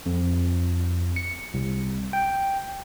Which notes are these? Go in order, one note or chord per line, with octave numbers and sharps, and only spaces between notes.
F2
C#7
C2
G5